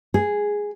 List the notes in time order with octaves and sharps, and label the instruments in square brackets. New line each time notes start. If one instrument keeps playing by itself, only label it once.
[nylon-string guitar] G#4